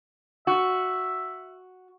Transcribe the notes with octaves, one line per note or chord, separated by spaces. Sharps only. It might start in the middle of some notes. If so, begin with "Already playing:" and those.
F#4 E5